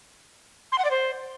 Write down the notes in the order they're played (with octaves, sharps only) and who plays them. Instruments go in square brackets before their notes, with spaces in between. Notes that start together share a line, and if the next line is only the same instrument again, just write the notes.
[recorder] C6
F#5
D5
C5